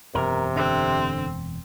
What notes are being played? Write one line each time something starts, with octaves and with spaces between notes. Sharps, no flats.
E1 F#2 C3 A#4
D3 C4